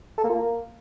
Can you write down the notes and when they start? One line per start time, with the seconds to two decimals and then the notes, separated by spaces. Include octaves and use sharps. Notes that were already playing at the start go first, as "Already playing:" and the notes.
0.18 A4
0.24 A#3
0.30 F4
0.35 A#3